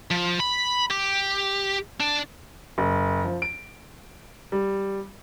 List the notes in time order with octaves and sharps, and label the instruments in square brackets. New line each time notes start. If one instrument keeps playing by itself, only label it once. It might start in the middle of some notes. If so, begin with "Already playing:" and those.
[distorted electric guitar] F3
B5
G4
D4
[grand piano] F#1
F3
D7
G3